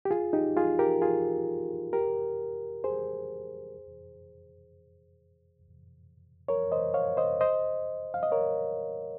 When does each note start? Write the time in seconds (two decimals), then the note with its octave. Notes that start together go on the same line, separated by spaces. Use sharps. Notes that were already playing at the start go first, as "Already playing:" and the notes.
0.05 G4
0.11 F4 G#4
0.33 D#4 G4
0.57 F4 G#4
0.79 G4 A#4
1.02 F4 G#4
1.93 G4 A#4
2.84 G#4 C5
6.48 A#4 C#5
6.72 C5 D#5
6.94 C#5 F5
7.17 C5 D#5
7.41 C5 D#5
8.14 F5
8.23 D#5
8.32 A#4 C#5